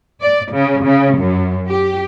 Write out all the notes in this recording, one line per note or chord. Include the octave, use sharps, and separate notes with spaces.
D5
C#3
C#3
F#2
G4